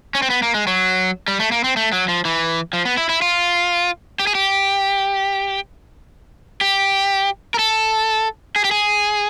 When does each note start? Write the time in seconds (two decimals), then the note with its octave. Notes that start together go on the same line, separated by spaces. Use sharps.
0.15 C#4
0.22 C4
0.30 B3
0.42 A#3
0.55 G#3
0.67 F#3
1.28 G3
1.40 A3
1.52 A#3
1.64 C4
1.77 A3
1.93 F#3
2.08 F3
2.25 E3
2.73 F3
2.85 B3
2.97 E4
3.09 E4
3.22 F4
4.19 G4
4.27 G#4
4.35 G4
6.61 G4
7.54 A#4
7.59 A4
8.56 G#4
8.64 G4
8.71 G#4